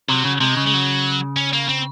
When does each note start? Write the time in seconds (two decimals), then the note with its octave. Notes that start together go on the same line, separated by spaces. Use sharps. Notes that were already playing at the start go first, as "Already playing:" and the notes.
0.09 C3 F#3
0.25 C#3
0.40 C3 G#3
0.57 C#3
0.67 G#3
0.74 F#3
1.37 C#4
1.53 A#3
1.69 C4